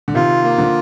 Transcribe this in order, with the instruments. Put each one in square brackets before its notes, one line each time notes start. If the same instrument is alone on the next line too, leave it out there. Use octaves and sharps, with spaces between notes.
[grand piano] D3
[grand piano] C3 D#3 [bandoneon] F4
[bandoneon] A#3
[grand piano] D3 F3